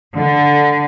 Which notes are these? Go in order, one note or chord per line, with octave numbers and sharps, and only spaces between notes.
D3